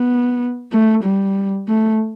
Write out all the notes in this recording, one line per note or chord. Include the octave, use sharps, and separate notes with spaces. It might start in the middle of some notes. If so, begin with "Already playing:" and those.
Already playing: B3
A3
G3
A3